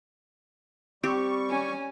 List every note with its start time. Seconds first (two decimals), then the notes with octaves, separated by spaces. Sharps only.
1.04 G3 C4 G4 C#6
1.49 C#4 G#5